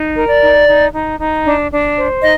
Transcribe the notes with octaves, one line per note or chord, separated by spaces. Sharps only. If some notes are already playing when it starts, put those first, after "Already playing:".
Already playing: D#4
A#4
D5
D#4
D#4
D#4
D#4
D4
D4
C5
D#4 D#5